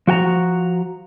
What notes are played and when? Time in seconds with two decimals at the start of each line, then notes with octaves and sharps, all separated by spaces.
0.07 F3 F#4 G5 A#5